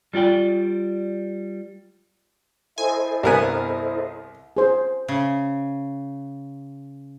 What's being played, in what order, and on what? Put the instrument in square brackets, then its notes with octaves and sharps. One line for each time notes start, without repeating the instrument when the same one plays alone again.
[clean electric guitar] G3 F4 D5 G5
[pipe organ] E4 [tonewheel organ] A4 C5 D#5 [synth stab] G#5
[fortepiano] C2 A#4 G#5 [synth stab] G2 B3
[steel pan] G#4 C5
[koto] C#3